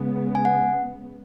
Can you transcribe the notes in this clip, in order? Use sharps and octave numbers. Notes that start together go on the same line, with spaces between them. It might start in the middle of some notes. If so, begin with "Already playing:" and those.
Already playing: C#3 G#3 B3
G#5
F#5